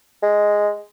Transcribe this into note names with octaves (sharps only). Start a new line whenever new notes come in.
G#3